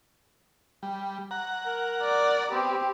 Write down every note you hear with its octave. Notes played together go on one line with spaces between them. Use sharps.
G3
F#5 A#5
A#4
D5
B3 C4 G4